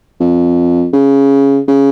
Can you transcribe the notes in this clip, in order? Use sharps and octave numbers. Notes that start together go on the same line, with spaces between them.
F2
C#3
C#3